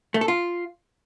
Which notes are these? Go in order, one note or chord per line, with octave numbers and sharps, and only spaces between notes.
A3
A4
F4